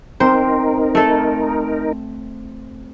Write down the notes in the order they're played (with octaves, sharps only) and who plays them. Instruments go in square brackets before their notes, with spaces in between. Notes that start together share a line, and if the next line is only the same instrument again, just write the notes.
[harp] C4 [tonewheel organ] D#4 A#4 [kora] C5
[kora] A3 A4